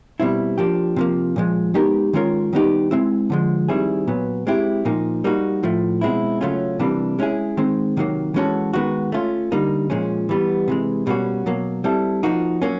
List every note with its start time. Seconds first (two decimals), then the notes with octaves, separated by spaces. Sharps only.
0.20 B2 G3 C4 E4
0.58 F3 A#3 D4 G4
0.96 C3 F3 A#3
1.36 A#2 F3 G#3
1.74 G#3 B3 D#4 G4 A#4
2.13 D#3 G#3 C#4 F4 A#4
2.53 D#3 G3 B3 D#4 G4
2.91 G#3 C4 E4
3.30 D3 F3 G#3
3.68 D#3 G3 C4 E4 G#4
4.07 A#2 F#3 B3
4.47 G#3 C4 E4 G4
4.85 A#2 F3 A#3 D#4
5.24 G3 A#3 D#4 F#4
5.63 A2 F3 A3
6.01 B2 G#3 C4 E4
6.41 C#3 F#3 A3 C#4 F4
6.79 C3 E3 G3 A#3 D4
7.19 G#3 C#4 E4 G#4
7.57 D#3 G#3 C4
7.97 C3 D#3 F#3 A#3
8.34 E3 G#3 C#4 F#4 A4
8.73 D#3 G#3 B3 D#4 F#4
9.12 A3 C#4 F4
9.52 D3 G3 A#3 D#4
9.90 A#2 F3 G#3 C#4
10.29 E3 G3 B3
10.68 C3 E3 G#3
11.07 B2 G3 A#3 C#4 F#4
11.46 B2 F#3 A#3
11.84 G3 C4 E4 A4
12.23 F3 A#3 D#4 F#4
12.62 F#3 A#3 C#4